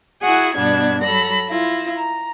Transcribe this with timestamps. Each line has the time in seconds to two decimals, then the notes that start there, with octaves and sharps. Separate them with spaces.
0.22 E4 F#4 G#4 F#5 G#5
0.56 G2 B2 B3 D4 G#6
1.02 F#3 A4 B5 A#6
1.49 E4 F4 A#6
1.96 A#5